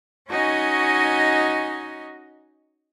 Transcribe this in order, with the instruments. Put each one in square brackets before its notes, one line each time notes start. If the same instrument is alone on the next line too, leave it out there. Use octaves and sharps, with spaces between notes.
[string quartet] C#4 D#4 F#4 D#5 G#5 C#6